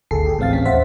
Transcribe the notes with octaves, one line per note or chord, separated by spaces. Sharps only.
G#1 D2 G#4 A4 C7
G4 G#4
A2 E3 C4 F5 A6
C#4 B6
D#2 C5 E5 F#5 B6